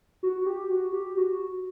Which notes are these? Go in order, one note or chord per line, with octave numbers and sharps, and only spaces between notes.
F#4
F#4
G4
F#4
G4
F#4